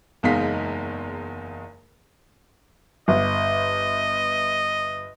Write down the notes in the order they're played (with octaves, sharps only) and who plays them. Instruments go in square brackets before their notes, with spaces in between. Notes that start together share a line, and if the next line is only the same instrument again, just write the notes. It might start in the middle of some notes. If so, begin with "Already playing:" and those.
[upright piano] F#1 E2 G#3 D#4 F5 B6
[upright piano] G1 [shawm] D#5